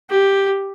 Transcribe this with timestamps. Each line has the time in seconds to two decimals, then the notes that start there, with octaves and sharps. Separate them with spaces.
0.10 G4